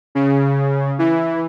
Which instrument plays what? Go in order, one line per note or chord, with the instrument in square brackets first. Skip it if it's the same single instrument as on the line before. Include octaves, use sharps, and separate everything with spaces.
[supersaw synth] C#3
E3